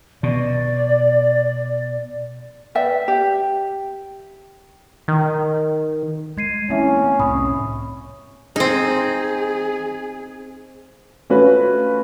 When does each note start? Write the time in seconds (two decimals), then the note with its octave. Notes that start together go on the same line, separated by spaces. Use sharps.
0.23 B2 D5
2.75 B4 D5 E5 G5
3.08 G4
5.08 D#3
6.37 G#3 G#6 C7 D#7
6.70 A3 A#3 C4 C#4 E4 E5
7.20 C2 A2 C4 B5 C#6 D#6
8.56 C4 D#4 G#4
11.30 A3 C#4 F4 F#4 B4